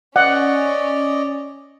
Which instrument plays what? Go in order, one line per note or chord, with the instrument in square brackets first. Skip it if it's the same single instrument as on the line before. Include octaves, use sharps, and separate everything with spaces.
[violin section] C#4 [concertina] D5 D#5 [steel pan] F#5